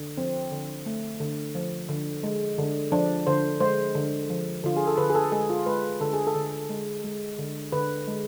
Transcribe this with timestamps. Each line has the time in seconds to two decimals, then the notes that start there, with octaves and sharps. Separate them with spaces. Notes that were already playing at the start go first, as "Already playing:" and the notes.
Already playing: D3
0.17 F3 C4
0.52 D3
0.86 A3
1.20 D3
1.55 F3
1.89 D3
2.23 G#3
2.58 D3
2.92 F3 D4
3.27 D3 C5
3.60 G#3 C5
3.95 D3
4.30 F3
4.63 D3 F4
4.77 G#4
4.87 A4
4.98 D3 B4
5.10 G#4
5.15 A4
5.32 G#3 G#4
5.50 F4
5.66 G#3 B4
6.01 D3 A4
6.13 G#4
6.27 A4
6.35 D3
6.70 G#3
7.04 G#3
7.38 D3
7.72 D3 B4
8.07 G#3